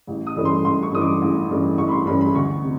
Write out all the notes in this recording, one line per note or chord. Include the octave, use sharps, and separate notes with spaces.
A1
D#6
G2 E3 A3 C#4
C6
A1 C6
C#6
G2 E3 A3 C#4 D#6
D6
A1
G2 E3 A3 C#4
A1 C#6
B5
C6
G2 E3 A3 C#4 B5
B5
D2 C#6
C3